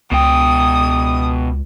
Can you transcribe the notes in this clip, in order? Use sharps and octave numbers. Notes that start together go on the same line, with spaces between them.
C#2 B2 G5 D#6